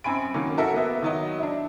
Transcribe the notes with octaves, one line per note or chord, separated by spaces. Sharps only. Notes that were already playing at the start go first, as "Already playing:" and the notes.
F#2 C4 G#5 B5 D7
D#3 F#3 A#3 C#4
E4 F#4 A4 A#4 E5
A#3 B3 E5
D#3 F#3 D#5
D4 E4